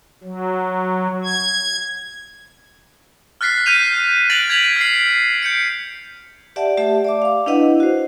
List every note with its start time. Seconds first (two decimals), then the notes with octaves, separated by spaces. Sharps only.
0.24 F#3
1.24 G#6
3.41 F6 F#6 A6 B6 C7
3.66 F6 G6 B6 D#7 F7
4.30 F#6 A6 A#6 D7 F7 F#7
4.50 G#6 A6 B6 F7 F#7
4.76 F6 C7
5.43 G6 C#7 D7
6.56 G4 D5 E5 F#5 A5
6.77 A3 G4 E5 A5
7.05 D5 A5 D6
7.22 F5 D6
7.46 D4 E4 B4 D#5 F#5
7.80 F#4 C5